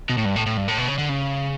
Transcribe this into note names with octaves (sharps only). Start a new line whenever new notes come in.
B2
A2
G2
A2
A2
G2
A2
B2
C#3
D3
C#3